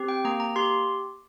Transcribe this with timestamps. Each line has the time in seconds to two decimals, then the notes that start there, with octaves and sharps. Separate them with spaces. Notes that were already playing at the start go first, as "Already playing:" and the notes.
Already playing: C4 G4
0.08 G5
0.25 A#3 A#5
0.40 A#5
0.56 G4 C6